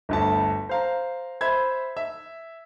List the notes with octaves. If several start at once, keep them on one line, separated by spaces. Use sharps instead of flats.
G1 D2 A5
C5 F5 A#5
C5 E5 B5 G#6
E5